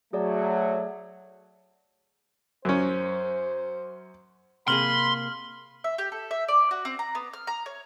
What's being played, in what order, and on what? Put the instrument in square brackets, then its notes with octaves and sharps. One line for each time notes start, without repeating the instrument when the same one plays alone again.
[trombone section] F#3 A3 [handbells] G#4 C#5 D5
[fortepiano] F#2 C#4 [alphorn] C5
[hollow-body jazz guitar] C3 A#3 G#4 [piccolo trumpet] B5 [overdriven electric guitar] C6 [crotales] F6 F#7
[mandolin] E5
G4
A4
E5
D5
F#4
C4
A#5
B3
F6
A#5
C#5